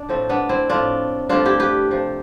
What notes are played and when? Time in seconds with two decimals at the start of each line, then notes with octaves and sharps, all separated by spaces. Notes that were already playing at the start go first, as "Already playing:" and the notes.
Already playing: D4
0.09 A2 F3 A3 C4
0.29 B3 D4
0.49 C4 E4
0.69 A2 F3 A3 D4 F4
1.29 G2 F3 A3 D4 F4
1.45 E4 G4
1.60 G4 B4
1.91 C3 F3 A3